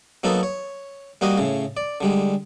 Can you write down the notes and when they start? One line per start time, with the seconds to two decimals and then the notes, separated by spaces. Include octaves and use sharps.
0.23 F#3 A#3 B3 D#4 A4
0.43 C#5
1.21 G3 A#3 F#4 D#5 F5
1.38 A2 C#3
1.77 D5
2.01 D3 G3 G#3